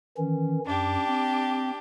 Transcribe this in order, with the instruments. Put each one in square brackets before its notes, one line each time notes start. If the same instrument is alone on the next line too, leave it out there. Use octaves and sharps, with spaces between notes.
[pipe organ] D#3 E3 C#4
[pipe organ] F#2 [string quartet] D4 G4
[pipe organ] C4